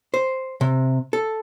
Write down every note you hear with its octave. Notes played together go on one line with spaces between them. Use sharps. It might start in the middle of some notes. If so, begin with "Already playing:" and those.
C5
C3
A4